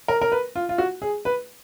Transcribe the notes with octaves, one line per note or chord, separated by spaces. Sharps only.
A#4
A#4
B4
F4
F4
F#4
G#4
B4